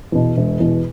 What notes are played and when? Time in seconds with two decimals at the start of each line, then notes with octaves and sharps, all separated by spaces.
0.12 E2 B2
0.37 E1
0.60 E2 B2